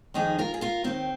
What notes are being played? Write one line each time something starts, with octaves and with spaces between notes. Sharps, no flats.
F2 D#3 D#4 G#4
F4 A#4
G#4
F4 A#4
D#2 D#3 C4